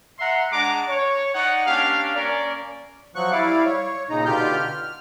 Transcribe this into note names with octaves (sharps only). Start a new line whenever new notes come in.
E5 F#5 A#5 C6
G#3 D4 F#5 A#5 D6
C#5
D#4 D5 F#5
A#3 C#4 D4 G4 F5
A#3 C#4 A#4 D5
F3 F#3 C#6 F#6
G3 E4 D5 F5
C#5
A#2 C#3 D#4 A#5
B2 D3 F4 G4 F6 G6
F6